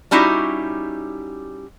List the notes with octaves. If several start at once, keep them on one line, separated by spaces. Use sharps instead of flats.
G3 C#4 D#4 E4 F#4 G4